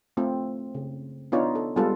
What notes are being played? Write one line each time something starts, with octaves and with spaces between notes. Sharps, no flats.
A3 C4 F4
C#3
B3 D4 D#4 F4 C#5
A4
G3 G#3 B3 F4 A4 B4